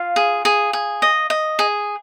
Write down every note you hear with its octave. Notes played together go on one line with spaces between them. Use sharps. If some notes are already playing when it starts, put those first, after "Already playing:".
Already playing: F4 F5
G#4
G#4
G#4
D#5
D#5
G#4